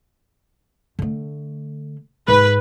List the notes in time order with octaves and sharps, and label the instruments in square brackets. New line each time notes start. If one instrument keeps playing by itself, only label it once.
[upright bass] D3 A3
[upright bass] G#2 [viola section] B4